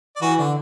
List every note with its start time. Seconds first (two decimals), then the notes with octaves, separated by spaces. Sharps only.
0.16 D5
0.22 E3 F#4 B4
0.38 D3 D4